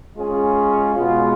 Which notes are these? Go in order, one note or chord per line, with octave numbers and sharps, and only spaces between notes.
G#3 C#4 F4 G#4
B2 G#3 B3 F4